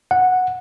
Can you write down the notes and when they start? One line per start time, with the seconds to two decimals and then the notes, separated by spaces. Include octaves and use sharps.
0.11 F#5